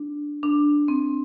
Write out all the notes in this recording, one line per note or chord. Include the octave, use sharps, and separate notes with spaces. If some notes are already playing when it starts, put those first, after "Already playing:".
Already playing: D4
D4
C4